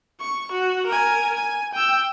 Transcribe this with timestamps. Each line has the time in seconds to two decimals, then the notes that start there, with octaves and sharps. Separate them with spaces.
0.20 C#6
0.52 F#4
0.87 A#4 G#5
1.34 G#5
1.73 G5 E6